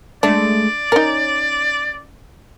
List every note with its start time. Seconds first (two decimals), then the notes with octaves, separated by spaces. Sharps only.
0.23 G#3 A3 D4 D5
0.92 C#4 D#4 A#4